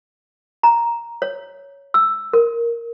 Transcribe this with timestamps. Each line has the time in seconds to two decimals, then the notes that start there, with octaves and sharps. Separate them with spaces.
0.63 A#5
1.22 C#5
1.94 E6
2.33 A#4